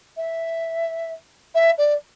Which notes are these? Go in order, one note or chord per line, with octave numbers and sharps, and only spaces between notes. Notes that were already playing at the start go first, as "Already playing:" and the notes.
E5
E5
D5